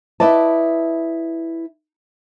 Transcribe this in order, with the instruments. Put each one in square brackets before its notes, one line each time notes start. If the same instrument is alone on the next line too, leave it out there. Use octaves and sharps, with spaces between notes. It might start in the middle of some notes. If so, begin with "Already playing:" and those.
[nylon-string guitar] E4 B4 D5 D#5 A5